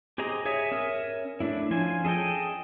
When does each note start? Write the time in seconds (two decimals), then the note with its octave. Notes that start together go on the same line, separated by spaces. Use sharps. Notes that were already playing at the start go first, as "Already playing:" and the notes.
0.18 G4 G#4 C5 D#5 A#5
0.45 G#4 C#5 D#5 E5
0.72 C#4 A#4 C#5 E5
1.40 A3 D4 E4
1.71 F3 C#4 C5 G#5
2.05 G#4 A4 D#5 G5